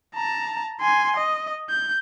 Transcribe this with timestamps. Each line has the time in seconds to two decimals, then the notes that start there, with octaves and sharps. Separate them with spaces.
0.15 A5 A#5
0.80 G#5 C6
1.17 D#5
1.69 G6